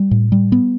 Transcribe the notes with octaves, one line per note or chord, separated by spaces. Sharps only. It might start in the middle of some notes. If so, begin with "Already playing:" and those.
Already playing: G3
A2
G3
B3